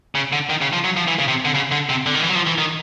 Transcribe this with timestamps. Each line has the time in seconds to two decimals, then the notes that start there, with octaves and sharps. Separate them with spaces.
0.15 C#3
0.33 D3
0.49 D#3
0.61 C#3
0.73 F3
0.84 F#3
0.97 F3
1.08 E3
1.19 C#3
1.28 C3
1.45 D3
1.55 C#3
1.72 D3
1.89 C3
2.06 D3
2.15 D#3
2.23 E3
2.30 F#3
2.35 F3
2.47 E3
2.58 D#3